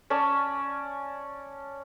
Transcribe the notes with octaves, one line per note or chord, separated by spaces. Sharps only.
C#4 C#5 D5 A5